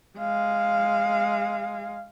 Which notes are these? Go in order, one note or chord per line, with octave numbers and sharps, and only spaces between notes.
G#3 F5